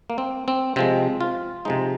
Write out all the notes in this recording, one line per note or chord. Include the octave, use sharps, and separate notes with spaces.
A#3
C4
C4
C3 F3 G#3 C4
F4
C3 F3 G#3 D#4